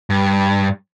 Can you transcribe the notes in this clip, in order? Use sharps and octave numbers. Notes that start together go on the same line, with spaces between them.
G2